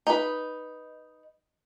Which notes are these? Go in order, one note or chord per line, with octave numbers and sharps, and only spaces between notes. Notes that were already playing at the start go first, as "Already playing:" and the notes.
D#4 B4